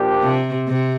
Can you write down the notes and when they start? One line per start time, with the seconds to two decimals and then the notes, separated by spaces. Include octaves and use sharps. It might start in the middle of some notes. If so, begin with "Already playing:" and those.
Already playing: A#2 F3 D4 G4
0.23 C3
0.68 C3